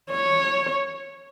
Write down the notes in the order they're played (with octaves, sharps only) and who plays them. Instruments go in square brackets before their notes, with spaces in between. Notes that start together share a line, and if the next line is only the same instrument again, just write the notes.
[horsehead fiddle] C#5